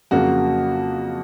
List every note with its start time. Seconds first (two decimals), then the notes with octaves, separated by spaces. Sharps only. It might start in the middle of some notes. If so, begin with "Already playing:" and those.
0.11 F2 C#3 F#3 A#3 F#4